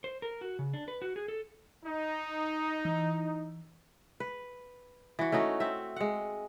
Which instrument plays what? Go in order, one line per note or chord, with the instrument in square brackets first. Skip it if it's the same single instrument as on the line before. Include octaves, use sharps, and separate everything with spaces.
[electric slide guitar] C5
A#4
F#4
C#3
D4
B4
F#4
G#4
A4
[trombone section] D#4
[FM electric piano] E3
[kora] B4
E3 F#4
A3 C#4 D#4 F#4
C4 E5
G#3 F#5